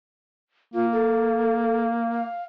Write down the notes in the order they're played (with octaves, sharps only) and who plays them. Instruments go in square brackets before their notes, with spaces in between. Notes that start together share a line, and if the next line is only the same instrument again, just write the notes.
[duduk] A#3 [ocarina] F4
[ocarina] A4
F5